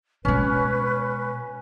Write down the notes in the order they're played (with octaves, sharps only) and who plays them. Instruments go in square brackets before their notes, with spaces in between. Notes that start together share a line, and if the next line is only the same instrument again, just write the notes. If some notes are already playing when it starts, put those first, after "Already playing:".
[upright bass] B2 G#3 [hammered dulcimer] C#4 [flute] B4